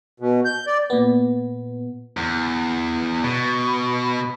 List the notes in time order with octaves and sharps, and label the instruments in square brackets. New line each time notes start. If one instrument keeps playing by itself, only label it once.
[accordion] B2
G6
D5
[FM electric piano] A#2 B3
[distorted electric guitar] E2
B2